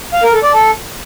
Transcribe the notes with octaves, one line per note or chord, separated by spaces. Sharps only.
F5
A#4
A4
D5
A4